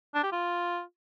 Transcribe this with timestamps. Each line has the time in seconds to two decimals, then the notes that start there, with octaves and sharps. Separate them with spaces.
0.15 D4
0.23 G4
0.32 F4